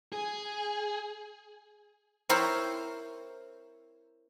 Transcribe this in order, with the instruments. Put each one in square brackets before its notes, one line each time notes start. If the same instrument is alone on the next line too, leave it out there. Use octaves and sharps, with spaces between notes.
[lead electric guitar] G#4 [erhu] G#5
[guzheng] C4 E4 A#4 C5 C#5